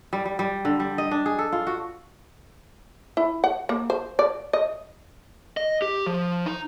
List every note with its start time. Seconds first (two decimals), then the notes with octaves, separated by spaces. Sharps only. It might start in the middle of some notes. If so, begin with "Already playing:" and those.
0.13 G3
0.25 G3
0.39 G3
0.65 D3
0.80 G3
0.98 D#5
1.11 D4
1.26 G#4
1.39 A4
1.52 F4
1.67 F#4
3.17 E4
3.44 F#5
3.69 A#3
3.90 C5
4.19 D5
4.53 D#5
5.57 D#5
5.82 G4
6.07 F3
6.46 D#4